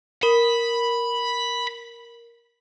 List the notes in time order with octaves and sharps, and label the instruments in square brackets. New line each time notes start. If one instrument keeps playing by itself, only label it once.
[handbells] A#4 [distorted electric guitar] B5